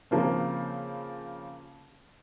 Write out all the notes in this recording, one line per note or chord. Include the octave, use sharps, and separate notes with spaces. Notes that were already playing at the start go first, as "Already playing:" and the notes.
C#3 F3 A#3 C4